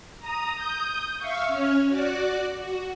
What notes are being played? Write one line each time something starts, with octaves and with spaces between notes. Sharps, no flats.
A#5 D#6
D#6 G6
E5 F5 C#6
C#4 C#5 F6
F#4 D5 F#6
F#4